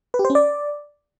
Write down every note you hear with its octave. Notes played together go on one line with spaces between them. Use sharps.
B4
G4
C5
C#4
D5